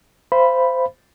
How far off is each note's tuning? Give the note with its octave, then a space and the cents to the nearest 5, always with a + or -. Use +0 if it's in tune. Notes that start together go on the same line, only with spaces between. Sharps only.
C5 -15 F5 -40 B5 +0